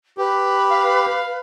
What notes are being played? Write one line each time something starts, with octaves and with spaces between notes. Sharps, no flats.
G4 B4
F5